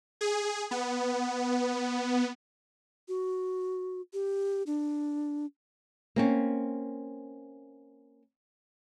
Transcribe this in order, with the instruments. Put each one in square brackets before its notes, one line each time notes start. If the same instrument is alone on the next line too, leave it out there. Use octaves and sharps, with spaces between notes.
[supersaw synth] G#4
B3
[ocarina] F#4
G4
D4
[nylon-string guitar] A#3 C4 C#4